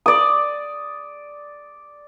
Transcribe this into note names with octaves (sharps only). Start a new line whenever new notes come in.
D5 D#6